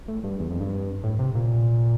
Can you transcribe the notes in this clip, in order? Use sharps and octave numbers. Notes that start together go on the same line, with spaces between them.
A2
G2
E2
F2
G2
A2
C3
A#2